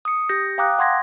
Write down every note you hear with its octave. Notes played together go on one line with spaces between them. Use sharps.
D#6 C#7
G4 G6 A#6 C#7
F5 G5 A#5 D6 D#6 F#6
F#5 C6 G#6 A#6